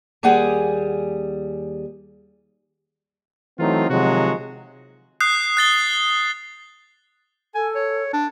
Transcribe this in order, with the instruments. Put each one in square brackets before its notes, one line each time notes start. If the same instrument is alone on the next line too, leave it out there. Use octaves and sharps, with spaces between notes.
[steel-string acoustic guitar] D#2 G3 G#4 F#5 G#5
[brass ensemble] E3 F#3 A3 C4 D#4 F4
C3 D#3 F3 F#3 G#3 F#4
[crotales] D#6 F#6 G6 C7
F#6 A6 G7
[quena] A4 [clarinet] G#5
[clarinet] C#5
D4